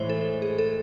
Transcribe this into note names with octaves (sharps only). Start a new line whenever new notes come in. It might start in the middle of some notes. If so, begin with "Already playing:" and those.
Already playing: A2 E3 G#3 C5 C#5
A4
G#4
A4